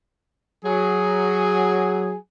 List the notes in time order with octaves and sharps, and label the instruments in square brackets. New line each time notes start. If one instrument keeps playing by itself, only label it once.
[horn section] F#3 G#4